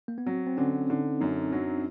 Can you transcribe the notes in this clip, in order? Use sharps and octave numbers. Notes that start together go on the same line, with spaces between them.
A#3
B3
F#3 C4
C4
D3 C#4
D3 D#4
F#2 D#4
F#3 D4